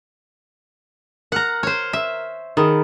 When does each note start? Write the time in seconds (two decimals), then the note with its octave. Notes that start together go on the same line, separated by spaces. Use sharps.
1.32 A#4 F#5 A#5 F6
1.63 C5 C#5
1.93 E5
2.57 D#3 D#4 G#4 B5